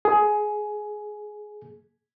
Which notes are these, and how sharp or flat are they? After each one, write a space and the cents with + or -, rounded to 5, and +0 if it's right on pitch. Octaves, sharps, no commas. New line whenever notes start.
G#4 +15